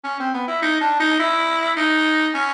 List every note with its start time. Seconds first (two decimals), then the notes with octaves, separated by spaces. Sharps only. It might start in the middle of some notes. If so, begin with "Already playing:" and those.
0.04 C#4
0.19 C4
0.34 B3
0.48 E4
0.62 D#4
0.81 D4
1.00 D#4
1.19 E4
1.76 D#4
2.34 C#4